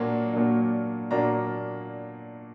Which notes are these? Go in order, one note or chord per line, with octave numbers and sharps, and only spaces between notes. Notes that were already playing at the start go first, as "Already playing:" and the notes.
Already playing: A#2 F#3 A#3 D4
A#2 F#3 A#3 D4
A#2 F#3 A#3 D4 A#5